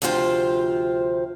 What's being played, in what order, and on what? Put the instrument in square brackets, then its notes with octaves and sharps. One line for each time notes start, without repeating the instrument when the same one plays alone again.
[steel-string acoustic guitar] D2 C3 F3 F4 C5 G5